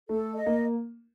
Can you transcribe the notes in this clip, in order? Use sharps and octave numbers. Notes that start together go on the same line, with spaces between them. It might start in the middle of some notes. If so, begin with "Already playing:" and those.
A3 A4
D#5
A#3